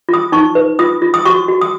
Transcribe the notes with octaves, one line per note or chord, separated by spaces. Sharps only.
F4 D#6
D#4 C#6
B4
F4 D#6
F4
D#6
F#4 C#6
F#4
D#6